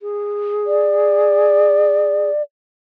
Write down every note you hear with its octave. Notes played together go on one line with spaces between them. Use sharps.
G#4
D5